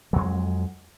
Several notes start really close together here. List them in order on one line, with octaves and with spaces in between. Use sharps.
F#3 F2 G#3